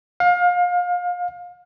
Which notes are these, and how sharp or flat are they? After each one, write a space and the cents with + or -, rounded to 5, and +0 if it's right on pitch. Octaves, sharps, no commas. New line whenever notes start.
F5 +30